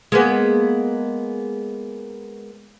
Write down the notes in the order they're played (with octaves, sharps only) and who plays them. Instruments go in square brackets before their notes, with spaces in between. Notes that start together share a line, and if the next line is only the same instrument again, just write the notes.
[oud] G#3 A#3 B3